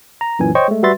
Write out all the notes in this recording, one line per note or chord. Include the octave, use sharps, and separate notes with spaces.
A#5
F#2 A#2 E3 G#5
C5 C#5 D#5 G5 C#6
G#3 A3
G3 F#4 B4 E5 C6 A6